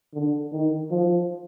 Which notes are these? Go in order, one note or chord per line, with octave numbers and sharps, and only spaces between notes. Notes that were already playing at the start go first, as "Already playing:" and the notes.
D3
D#3
F3